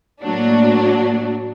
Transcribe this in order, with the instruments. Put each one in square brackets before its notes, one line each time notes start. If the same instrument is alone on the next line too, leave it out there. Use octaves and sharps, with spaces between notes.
[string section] A2 F#3 A#3 D4